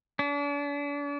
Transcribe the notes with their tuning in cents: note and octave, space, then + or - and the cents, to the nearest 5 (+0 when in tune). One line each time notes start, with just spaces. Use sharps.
D4 -40